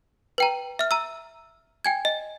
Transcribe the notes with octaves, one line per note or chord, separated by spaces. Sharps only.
B4 G5 A#5
E5 F6
A#5 E6
G5 G#5 G#6
D#5